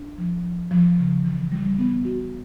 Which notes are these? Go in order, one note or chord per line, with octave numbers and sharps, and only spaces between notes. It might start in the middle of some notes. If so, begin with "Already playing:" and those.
Already playing: D4
F3
F3
F3
C#3
E3
G3
B3
F#4